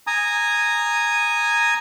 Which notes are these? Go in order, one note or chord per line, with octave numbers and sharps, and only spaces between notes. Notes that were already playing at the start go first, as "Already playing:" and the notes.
G#5 A#5 D#6